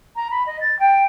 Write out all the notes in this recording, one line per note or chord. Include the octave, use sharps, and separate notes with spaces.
A#5
B5
D#5
A6
G5